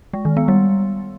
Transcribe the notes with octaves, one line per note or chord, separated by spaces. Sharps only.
G#3
D#3
B3
G3